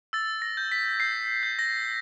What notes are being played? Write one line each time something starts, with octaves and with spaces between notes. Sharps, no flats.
E6 A6
A#6
G6
B6
G6 C7
G6
A#6